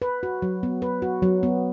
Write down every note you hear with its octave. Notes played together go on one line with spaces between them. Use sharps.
B4
F#4
F#3
B3
B4
F#4
F#3
B3